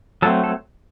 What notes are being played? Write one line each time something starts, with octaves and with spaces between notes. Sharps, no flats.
F#3 A3 C4 A4
A4